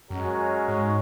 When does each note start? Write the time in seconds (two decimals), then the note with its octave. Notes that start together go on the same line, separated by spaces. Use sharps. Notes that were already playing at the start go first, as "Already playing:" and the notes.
0.10 F#2 G#3 C#4 F#4 A#4 C#5
0.68 G#2